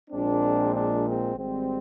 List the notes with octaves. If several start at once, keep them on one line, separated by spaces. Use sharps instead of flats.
A#1 A#2 G#3 C4 D4
D4
C4
G#1 G#2 G3 C4